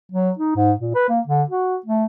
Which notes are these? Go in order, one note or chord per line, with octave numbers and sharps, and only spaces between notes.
F#3
D#4
G#2
A#2
B4
A#3
D3
F#4
A3